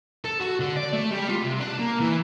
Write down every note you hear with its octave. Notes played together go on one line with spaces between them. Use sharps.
A4
F#4
D3
D5
A3
G3
F4
C3
D4
A#3
E3